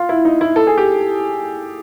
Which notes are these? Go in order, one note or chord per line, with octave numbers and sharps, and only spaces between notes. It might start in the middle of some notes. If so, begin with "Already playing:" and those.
Already playing: F4
E4
D#4
E4
A4
G#4
G4